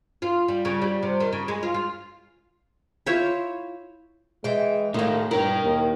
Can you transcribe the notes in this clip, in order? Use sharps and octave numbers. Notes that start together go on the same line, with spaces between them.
F4
G3
C#3
G3
C3
D#3
C#3
G#3
F4
F4
E4 F4 C5 C#5
E3 G#3 G5
A2 D#3 A3 A#3 D#4
G2 E4 A#4 G5
D#2